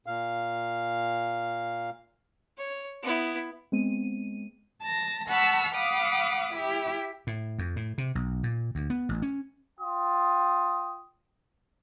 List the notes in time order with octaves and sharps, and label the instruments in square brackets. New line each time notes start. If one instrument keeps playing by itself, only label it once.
[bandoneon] A#2 F5
[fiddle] C#5
B3 E4
[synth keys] G#3 B3 C4 D#7
[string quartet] A5 A#6
F#5 A5 B5 C#6 E6 F6
F5 F#5 B5 D6 D#6
E4 G4
[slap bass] A2
F2
A2
C3
B1
A#2
D2
B3
A1
C#4
[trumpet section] F4 G5 D#6